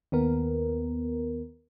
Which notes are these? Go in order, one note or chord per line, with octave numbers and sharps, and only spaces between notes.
D#2 B3 A#4